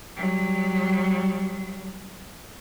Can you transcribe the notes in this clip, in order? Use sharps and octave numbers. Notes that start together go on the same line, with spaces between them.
F#3 G3